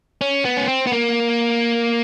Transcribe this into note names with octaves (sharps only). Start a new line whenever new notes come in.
C#4
B3
C#4
C4
B3
A#3